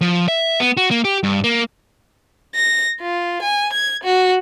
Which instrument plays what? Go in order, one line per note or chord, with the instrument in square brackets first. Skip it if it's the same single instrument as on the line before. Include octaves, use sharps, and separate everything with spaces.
[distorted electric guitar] F3
E5
B3
F#4
A#3
G4
G2
A#3
[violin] A#6
F4
G#5
G#6
F#4